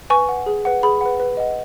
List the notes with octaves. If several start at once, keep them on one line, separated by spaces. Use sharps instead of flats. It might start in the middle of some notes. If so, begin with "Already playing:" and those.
B4 G#5 C#6
F#5
G#4
B4 F#5
G#4 B5
B4 F#5
B4
D#5 F#5